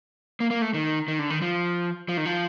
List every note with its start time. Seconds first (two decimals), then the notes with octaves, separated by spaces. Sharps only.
0.40 A#3
0.51 A#3
0.62 A3
0.74 D#3
1.08 D#3
1.19 D3
1.30 D#3
1.42 F3
2.09 F3
2.17 D#3
2.26 F3